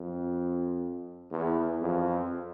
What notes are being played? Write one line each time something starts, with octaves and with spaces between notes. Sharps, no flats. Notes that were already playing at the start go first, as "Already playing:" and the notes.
Already playing: F2
E2
F2